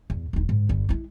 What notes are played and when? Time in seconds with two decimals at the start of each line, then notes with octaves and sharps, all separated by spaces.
0.10 E2
0.33 E1 D#4
0.49 G#2 D3
0.69 G1 D3
0.89 G#3 E4